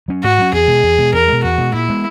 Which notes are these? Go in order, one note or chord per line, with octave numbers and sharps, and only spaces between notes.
F#3 C#4
G#2 F#4
F#3 C#4
E2 G#4
B2 G#3
E2
B2 G#3
E2 A#4
B2 G#3
E2 F#4
B2 G#3
A#2 E4
G#3 B3